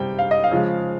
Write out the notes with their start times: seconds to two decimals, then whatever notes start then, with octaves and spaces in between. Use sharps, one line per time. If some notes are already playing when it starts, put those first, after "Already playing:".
Already playing: C3 G3 G5
0.19 F5
0.31 D#5
0.44 F5
0.51 C#3 F3 G#3